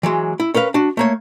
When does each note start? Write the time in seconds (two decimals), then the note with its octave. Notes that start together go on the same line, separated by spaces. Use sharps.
0.03 E3 F#3 G#3
0.40 E4
0.54 C#4 A#4 B4 F5
0.74 D4 F#4
0.97 A3 A#3 C#5